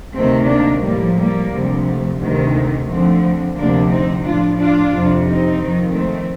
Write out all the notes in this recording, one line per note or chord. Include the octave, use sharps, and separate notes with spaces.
D2 C3 D#3 A3 C4
A#3 D4
A2 F3 G3 A#3
G3 A#3
D2 C3 F3
A3
D2 C3 D#3 G3
A3
D2 D3 F3 A3 C4
D2 C3 F3 A#3 D4
C4 D#4
A2 F3 D4 F4
D4 F4
F2 C3 F3
C4 D#4
F2 D#3
A3 C4